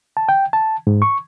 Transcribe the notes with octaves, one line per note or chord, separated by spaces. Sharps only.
A5
G5
A5
G#2
C#6